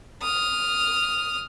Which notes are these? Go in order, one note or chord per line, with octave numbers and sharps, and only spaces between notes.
D#6 F6